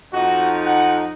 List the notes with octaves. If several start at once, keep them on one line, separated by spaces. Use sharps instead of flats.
F2 D#4 F#4
F#5